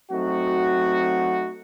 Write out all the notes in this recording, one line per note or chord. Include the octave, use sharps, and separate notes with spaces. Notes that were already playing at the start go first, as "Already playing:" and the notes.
F#3 A3 C4 D#4 F#4